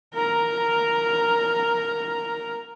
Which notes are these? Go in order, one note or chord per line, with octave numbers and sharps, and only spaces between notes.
A#4 A#5